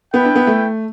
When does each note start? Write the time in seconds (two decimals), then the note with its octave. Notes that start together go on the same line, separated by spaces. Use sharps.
0.13 B3 E4 B4 G5
0.25 D4
0.36 B3
0.47 A3